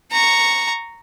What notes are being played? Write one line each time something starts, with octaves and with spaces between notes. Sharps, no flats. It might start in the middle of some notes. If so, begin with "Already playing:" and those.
A#5 C#6